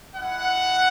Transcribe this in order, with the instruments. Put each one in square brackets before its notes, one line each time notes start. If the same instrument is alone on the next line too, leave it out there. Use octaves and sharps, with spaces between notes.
[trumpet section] G#3 E4 F#5